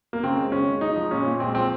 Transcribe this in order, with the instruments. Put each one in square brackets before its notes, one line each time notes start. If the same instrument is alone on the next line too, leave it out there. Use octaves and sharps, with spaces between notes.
[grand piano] A#3
C#3 C4
G#3
C#3 C#4
G#3
G#3 D#4
F3
A#2 C#4
A#2
G#3 C4
F3 C4